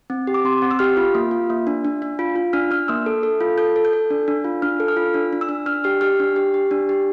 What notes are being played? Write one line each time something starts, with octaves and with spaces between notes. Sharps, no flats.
C4
G4
D6
C4 C6
C4
E6
G4 F6
F4
A#3
F4
A#3
D4
D4
D4
F4
F4
D4 F6
D4 F6
A#3 E6
A4
A4
F4
A4 G6
A4
G6
A4
D4
D4
F4
D4 F6
A4
F6
F4
D4
D4
E6
D4
D4 F6
G4 F6
G4 F6
D4
G4
G4
D4
G4